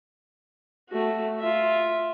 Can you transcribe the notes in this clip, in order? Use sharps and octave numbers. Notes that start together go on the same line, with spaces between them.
A3 F#4
F4 E5